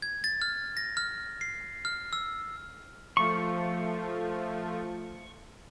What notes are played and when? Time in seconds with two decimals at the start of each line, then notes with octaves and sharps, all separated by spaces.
0.02 G#6
0.24 A6
0.42 F6
0.77 A#6
0.97 F6
1.41 C7
1.85 F6
2.13 E6
3.17 F3 A3 F4 C#6